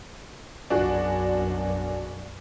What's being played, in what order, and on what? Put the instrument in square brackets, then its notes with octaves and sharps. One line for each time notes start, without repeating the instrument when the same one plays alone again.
[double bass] B1 F#2 [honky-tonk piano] D4 F#4 G#4